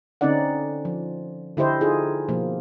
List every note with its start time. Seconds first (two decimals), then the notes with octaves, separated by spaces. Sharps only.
0.21 D3 C4 C#4 D#4 D5 F#5
0.85 F3
1.57 D3 E4 G4 C5 D#5
1.81 D#4 F4 G#4
2.28 B2 F3 A#3